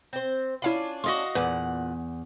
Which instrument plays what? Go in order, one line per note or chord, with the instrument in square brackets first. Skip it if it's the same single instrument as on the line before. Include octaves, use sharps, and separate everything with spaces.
[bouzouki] C4 C5
[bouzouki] C#4 D4 F4 [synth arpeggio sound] E4 F5 B5
[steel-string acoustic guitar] F#4 D#5 F5 [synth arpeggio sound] C6 A#6
[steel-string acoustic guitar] E2 [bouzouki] A#2 F#5 [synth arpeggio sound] B4